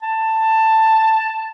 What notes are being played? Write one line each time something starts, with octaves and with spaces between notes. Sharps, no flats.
A5